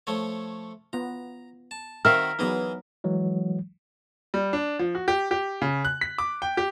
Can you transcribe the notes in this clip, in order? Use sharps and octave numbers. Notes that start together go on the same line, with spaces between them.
F3 A3 C#5
B3 F4 A#5
A5
D#3 C4 F#4 A#4 E5 F5 F6
E3 F#3 B3 D#4 G#4 A#5
E3 F#3 G#3
G3
D4
F3
F#4
G4
G4
C#3
F#6
B6
D6
G5
G4